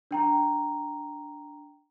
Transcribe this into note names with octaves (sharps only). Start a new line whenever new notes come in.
D4 G5 A#5